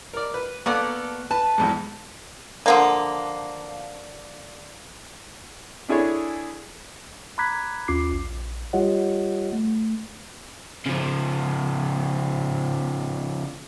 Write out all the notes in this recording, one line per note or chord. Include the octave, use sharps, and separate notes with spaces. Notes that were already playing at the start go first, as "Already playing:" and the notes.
A#4 D5
B4
A#3 B3 A4 D5 C#6
B4 A5
B1 E2 G#2
D3 F3 A#3
D4 E4 G#4 A4 C#5
A#5 B5 D6 F#6 G#6 B6
D#2 C#4 F4 D6 C7
A#1
G3 F4 G4 C#5 D#5 F#5
A3
C#3 F3